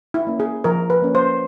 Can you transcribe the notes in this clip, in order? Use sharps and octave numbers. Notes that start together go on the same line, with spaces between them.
E4
A#3 C#4
G#4
F3 A#4
B4
A#3 C#4
C5